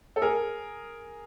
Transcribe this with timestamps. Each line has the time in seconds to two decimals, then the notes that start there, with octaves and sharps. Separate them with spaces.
0.16 A4
0.22 G#4 A#4